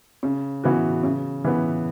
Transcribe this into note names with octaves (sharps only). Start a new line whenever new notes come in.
C#3
E3 B3 F#4
C#3
E3 B3